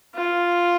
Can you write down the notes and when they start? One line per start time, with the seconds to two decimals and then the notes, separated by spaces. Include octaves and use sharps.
0.15 F4